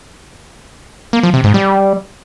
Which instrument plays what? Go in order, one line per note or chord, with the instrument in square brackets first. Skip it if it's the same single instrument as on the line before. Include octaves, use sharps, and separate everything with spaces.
[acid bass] A#3
F3
C3
G#2
G3